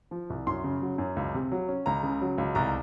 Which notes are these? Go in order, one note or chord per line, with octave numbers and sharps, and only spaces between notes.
F3
C2
F#2 C6
C#3
F#3
F#2
C#2
C3
F#3
C#4
C#2 A#5
C#3
F#3
C#2
C2 A#5